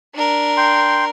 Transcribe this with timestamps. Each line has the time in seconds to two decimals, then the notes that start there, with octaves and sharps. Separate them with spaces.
0.14 D4 A#4
0.57 G5 C6